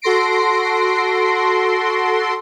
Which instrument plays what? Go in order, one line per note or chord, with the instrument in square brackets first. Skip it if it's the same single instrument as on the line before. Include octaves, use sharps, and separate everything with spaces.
[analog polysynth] F#4 A4 C6 A#6 C7 D7